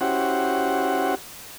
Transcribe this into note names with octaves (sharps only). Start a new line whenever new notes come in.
C#4 E4 F#4 G4 C5 F#5